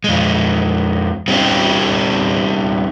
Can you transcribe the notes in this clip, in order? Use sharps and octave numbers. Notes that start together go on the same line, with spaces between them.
F2 G#3
G3 C4 C#4 D#4 G4